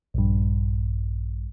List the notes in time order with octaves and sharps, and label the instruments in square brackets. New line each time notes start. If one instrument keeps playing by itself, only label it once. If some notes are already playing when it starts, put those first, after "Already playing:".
[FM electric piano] A#1 G2